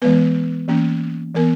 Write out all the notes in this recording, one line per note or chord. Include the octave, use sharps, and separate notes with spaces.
E3 G#3 B3 B4
E3 A#3 C#4
E3 B3 A#4